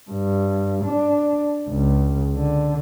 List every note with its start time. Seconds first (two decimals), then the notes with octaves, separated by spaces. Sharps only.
0.11 G2
0.85 D4
1.69 C#2
2.35 D3